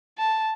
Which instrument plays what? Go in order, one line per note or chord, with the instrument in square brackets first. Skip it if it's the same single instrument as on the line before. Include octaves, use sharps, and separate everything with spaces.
[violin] A5